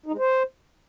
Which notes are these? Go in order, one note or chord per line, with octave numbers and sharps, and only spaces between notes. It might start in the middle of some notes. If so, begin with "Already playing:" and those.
D#4
G#3
C5